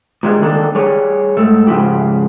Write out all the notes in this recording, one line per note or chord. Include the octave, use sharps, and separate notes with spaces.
A#2 G3 G#3
D3 D#3 A#3 D4 A4
G3 G#4 C#5
G#2 A3
G#2 C#3 F3 E4 G4